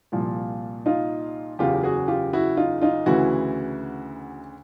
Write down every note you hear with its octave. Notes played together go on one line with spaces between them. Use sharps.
C2 A#2 F3
D#4 F4
F#1 E2 C#3 F4 G4
F#4 G#4
F4 G4
E4 F#4
D#4 F4
D#4 F4
D2 C#3 E3 E4 F#4